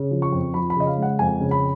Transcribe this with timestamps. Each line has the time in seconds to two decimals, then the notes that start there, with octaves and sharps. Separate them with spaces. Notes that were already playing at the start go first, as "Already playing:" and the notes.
Already playing: C#3
0.11 F3
0.22 C#6
0.33 F2
0.54 F3 B5
0.70 B5
0.76 C#3 D#5
0.87 F5
0.97 G#3
1.02 F#5
1.19 F2 G#5
1.41 C#3
1.51 B5